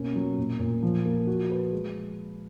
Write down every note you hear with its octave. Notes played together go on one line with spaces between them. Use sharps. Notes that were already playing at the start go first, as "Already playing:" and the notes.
Already playing: B2 A#3 C#4
F#3
A#2
A#2
F3
A#3
F#4
B4
G#3